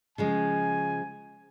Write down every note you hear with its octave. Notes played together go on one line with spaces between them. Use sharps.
C#3 F3 G#3 G#5